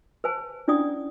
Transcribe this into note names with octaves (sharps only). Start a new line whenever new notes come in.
B4 C5 G#5 A5
C#4 D4 E4 D5 D#6